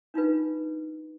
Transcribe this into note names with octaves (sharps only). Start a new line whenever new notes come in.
D4 D#4 F4 B4